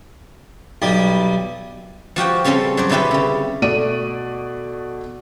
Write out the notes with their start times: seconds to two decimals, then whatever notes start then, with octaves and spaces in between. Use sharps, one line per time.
0.82 B1 G3
2.16 F3 F#4 G4 G5
2.44 C#3 G3 C4 C#4 A4
2.77 F#3 C5 D5
2.89 B2 D3 E4 G4 B4
3.11 C#3 G3
3.62 B2 A3 D5 D#7